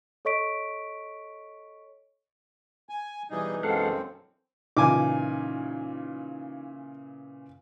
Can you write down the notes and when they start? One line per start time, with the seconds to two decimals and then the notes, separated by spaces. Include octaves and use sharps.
0.25 A4 C#5 D#5 C#6 B6 D7
2.89 G#5
3.31 B2 E3 G3 D#4 G#4
3.63 F#2 G#3 C4 A4 F5 F#5
4.77 A#2 C#3 E3 D#4 G#5 D6